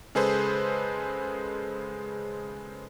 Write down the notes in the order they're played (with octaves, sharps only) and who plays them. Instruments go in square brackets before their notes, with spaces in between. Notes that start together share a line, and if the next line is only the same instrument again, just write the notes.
[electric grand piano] C#3 G#3 G#4 A4 B4 C5